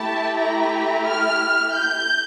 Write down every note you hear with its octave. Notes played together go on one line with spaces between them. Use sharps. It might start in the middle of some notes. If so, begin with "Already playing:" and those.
Already playing: A3 E4 G4 A5
A#5
F6
G6